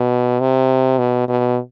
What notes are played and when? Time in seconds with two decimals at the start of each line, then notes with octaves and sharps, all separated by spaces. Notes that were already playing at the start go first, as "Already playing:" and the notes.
Already playing: B2
0.40 C3
0.99 B2
1.28 B2